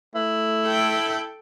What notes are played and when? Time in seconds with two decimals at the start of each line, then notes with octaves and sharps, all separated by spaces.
0.15 A3 E4
0.65 A4 G5